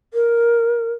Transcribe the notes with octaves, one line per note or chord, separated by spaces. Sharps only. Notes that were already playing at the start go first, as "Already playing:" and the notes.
A#4